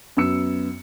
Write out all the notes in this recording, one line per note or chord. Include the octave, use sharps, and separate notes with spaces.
F#2 B3 E6 C#7